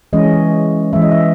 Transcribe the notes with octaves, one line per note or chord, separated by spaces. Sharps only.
E3 G#3 C#4 D#5
E3 G#3 C#4 E5
D#5
E5